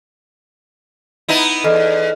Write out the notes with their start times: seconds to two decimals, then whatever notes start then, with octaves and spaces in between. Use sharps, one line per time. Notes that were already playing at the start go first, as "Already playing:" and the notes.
1.29 B3 D#4 E4
1.64 E2 A4 D#5 F6